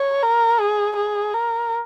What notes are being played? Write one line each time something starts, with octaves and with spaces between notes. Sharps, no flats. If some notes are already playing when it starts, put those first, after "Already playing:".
Already playing: C#5
A#4
G#4
G#4
A#4